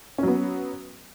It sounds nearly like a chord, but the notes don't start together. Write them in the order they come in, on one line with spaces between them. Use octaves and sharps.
C#4 F#3 B3